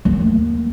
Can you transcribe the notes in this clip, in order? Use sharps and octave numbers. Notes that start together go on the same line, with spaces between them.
D#2